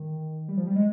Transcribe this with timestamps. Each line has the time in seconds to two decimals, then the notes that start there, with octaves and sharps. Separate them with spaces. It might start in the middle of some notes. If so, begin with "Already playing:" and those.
Already playing: D#3
0.48 G3
0.57 F3
0.67 G3
0.76 G#3